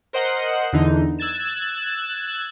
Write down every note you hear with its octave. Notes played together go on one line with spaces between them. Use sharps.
A#4 C5 D#5 F#5 C6
E2 D3 E3 D#4
E6 F#6 G#6 A6 E7